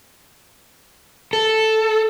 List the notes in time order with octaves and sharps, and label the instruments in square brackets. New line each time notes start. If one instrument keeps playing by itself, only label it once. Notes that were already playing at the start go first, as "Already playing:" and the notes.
[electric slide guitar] A4